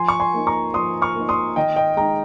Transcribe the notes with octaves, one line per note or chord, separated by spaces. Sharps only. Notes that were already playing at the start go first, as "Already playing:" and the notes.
Already playing: F3 G#5 C6
C#6
G#5 C6
A#3 D#4
A#5 C#6
F3 C6 D#6
C#6 F6
A#3 D#4
C6 D#6
D#3 D#5 G5
D#5 G5
G#3 D#4 G5 A#5